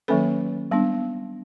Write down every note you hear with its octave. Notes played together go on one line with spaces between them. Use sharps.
D#3 F#3 A#3 C#4 A4 B4
G3 B3 D4